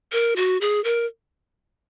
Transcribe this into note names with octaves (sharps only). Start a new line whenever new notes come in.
A#4
F#4
G#4
A#4